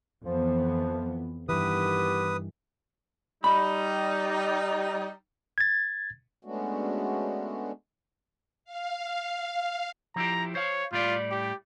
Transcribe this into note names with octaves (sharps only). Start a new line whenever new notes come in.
F2 E3 F3 B3
G2 D#3 E3 B3 G4 B4 D#6
G3 D#4 B5
G#6 A6
G#3 A3 B3 C#4 D4 F#4
F5
F3 E4 G4 A#5
C5 C#5 F5
A2 G3 F4 D5
G4